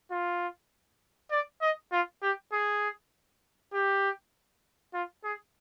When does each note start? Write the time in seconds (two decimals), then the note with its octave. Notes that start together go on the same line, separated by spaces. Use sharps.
0.11 F4
1.31 D5
1.61 D#5
1.92 F4
2.22 G4
2.52 G#4
3.73 G4
4.94 F4
5.24 G#4